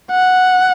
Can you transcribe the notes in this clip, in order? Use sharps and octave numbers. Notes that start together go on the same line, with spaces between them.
F#5